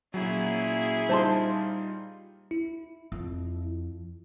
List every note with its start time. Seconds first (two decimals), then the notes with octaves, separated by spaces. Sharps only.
0.14 A#2 F#3 C#4 E4 G#4
1.09 G3 D#4 F4 C5 A5 C6
2.51 E4
3.12 F2